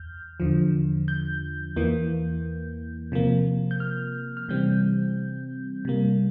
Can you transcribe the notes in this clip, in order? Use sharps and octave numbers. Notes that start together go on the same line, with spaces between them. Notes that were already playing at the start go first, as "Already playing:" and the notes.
Already playing: E2 F6 G6
E2 D3 F3
G6
E2 E3 A#3
C3 F3 A#3
G6
F6
F6
C3 E3 G3 C4 G6
C3 G3 A#3